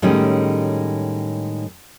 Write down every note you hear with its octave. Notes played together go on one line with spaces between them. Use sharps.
A2 D#3 G3 G#3 C#4